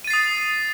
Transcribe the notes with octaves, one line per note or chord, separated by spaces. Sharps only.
D#6 A6 C7 D#7